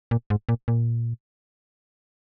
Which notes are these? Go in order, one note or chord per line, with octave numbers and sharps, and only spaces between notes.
A#2
G#2
A#2
A#2